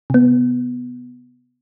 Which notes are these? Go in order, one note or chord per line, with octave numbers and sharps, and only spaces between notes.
C3 B3